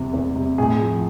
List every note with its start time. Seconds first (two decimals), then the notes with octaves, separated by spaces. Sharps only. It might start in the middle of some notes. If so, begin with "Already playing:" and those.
Already playing: E2 C3
0.13 E2
0.35 C3
0.58 A2 G#4
0.81 F3